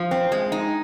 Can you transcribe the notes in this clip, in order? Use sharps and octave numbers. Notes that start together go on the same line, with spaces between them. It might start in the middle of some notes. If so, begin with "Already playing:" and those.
Already playing: F3
C4
G#3
D#4